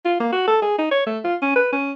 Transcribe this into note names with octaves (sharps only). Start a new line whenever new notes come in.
F4
A#3
F#4
A4
G#4
D#4
C#5
A3
F4
C#4
B4
C#4